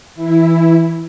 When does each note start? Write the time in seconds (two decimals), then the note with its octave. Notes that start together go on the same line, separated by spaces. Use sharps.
0.15 E3 E4